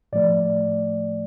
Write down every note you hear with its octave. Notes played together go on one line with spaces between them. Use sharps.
A2 F3 A3 D5